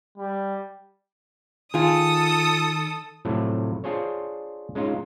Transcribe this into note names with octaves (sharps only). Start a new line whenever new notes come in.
G3
D#3 F4 G#4 A4 D#6
A2 C3 F3 F#3 A3
D4 F4 G#4 C5 C#5
G#3 C#4 D#4 F4